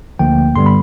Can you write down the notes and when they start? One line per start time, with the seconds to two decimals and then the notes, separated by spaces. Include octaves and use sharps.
0.19 D2 D3 F3 A#3 G5
0.55 G2 D3 G3 B3 C6
0.66 B5